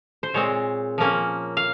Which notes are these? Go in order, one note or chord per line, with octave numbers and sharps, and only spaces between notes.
C5
A#2 G#3 C4 C#5
F3 A#3 C#4
F5